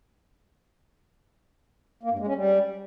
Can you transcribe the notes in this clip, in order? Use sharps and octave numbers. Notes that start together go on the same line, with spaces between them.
A#3
G2
G#3
C#4
G3